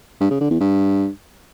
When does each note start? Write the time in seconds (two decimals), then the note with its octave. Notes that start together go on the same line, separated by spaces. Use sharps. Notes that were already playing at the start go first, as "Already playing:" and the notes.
0.21 G2
0.31 C#3
0.41 D3
0.51 E2
0.60 G2